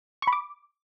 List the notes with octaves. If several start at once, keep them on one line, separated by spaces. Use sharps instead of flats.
C#6
B5
D6